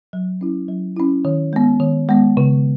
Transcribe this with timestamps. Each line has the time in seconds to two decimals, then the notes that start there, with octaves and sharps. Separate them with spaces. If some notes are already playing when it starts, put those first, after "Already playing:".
0.13 F#3
0.41 C#4 E4
0.69 F#3
0.96 C#4 E4
1.25 D#3
1.53 G#3 B3
1.80 D#3
2.09 G#3 B3
2.37 C#3